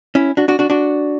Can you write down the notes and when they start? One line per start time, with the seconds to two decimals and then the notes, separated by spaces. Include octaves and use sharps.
0.15 C#4 E4
0.37 D4 F#4
0.48 D4 F#4
0.59 D4 F#4
0.70 D4 F#4